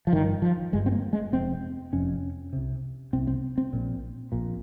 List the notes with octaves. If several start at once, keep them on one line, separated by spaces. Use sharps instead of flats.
F3
G1 G2 D#3
F3
G1 G2 G#3
C4
A#3
G#3
F1 F2 C3 C4
F1 F2 C3 C#4
C2 C3
C2 C3 C4
C4
C4
A#1 A#2
A#1 A#2